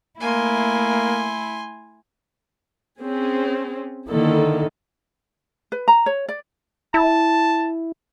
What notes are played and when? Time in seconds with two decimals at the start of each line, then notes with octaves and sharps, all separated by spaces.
0.20 A3 A#3 E4 G#5 C6
3.00 C4 C#4 G#4
4.10 D3 D#3 A#3 E4 A4
5.72 B4
5.88 A#5
6.06 C#5
6.29 D5
6.94 E4 A5